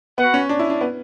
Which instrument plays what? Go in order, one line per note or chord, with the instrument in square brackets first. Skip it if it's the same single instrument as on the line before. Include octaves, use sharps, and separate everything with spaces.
[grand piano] B3 [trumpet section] F#4 B4 F#5
[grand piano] C#4
D4
E4
D4
B3